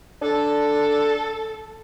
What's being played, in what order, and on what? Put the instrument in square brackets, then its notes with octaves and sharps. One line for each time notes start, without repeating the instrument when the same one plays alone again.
[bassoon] D4 [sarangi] A4